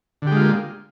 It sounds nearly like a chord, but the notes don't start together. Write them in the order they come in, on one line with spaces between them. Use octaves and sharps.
D3 G4 G#3 F4 A#3